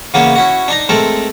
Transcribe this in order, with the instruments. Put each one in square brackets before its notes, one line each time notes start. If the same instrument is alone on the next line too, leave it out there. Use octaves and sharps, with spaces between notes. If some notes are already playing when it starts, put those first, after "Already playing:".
[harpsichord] C#3 E3 A#3 B3 C#4
C#4 E4 F#4
D4 D#4 A#5
G#3 A3 C4 A4 A#4